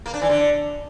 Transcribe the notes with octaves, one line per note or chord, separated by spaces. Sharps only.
A#3
D4
E3
D3